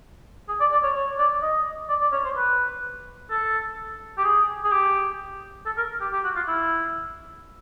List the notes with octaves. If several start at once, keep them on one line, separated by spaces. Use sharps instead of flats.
G#4
D5
D5
C#5
C#5
D5
D#5
D5
D5
C#5
C5
B4
A4
G4
G#4
G#4
G4
A4
A#4
G4
G4
F#4
F4
E4